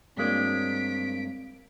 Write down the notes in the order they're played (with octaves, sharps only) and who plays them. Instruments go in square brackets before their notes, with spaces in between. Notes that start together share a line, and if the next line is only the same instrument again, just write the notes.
[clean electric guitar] G2 G#3 [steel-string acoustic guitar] F#3 A#3 D4 [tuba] C4 [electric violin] B6 D7